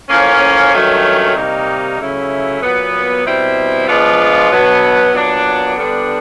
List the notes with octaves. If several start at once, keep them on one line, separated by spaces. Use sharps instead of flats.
A2 F3 A#3 C#4
G2 D#3 F#3 A3 C#4
C3 D#3 G3 A#3 D#4
C#3 F#3 A3 C#4 E4
A#2 F#3 B3
B2 G3 C4 E4
F3 G#3 B3 D4 F4
B2 F#3 B3 D4 F#4
A#2 F#3 B3 D4
D3 G3 B3 D4